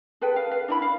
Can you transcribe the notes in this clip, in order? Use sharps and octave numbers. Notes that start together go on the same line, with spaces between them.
G#4 A4 B4 G5
F5
B4 F5
D4 E4 B5
F5